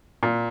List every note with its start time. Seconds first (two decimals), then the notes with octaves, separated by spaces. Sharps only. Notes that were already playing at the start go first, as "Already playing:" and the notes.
0.23 A#2